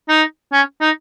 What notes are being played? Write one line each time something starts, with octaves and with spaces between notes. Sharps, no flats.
D#4
C#4
D#4